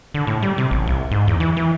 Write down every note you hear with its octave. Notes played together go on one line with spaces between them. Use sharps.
D3
A2
G3
C3
A1
C2
G#2
E2
E3
E3